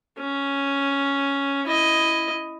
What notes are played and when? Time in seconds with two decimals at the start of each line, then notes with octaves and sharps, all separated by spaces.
0.18 C#4
1.67 E4 D#5